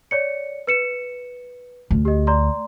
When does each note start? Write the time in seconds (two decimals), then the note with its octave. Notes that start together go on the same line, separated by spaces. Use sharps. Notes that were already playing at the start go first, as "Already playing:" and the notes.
0.11 C#5 D5 C#7
0.67 B4 C#7 E7
1.91 D2
2.05 G4 D#5
2.27 D5 A#5 C6